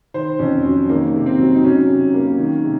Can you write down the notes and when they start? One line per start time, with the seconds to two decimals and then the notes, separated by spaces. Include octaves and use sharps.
0.14 D#3 C5
0.39 F2 C#4
0.64 F#3 C#4
0.89 D#3 A#3
1.14 C3
1.26 C4
1.39 F#3
1.55 D#4
1.64 F#3 C#4
1.89 C3
2.14 A#3
2.38 D#3
2.64 C3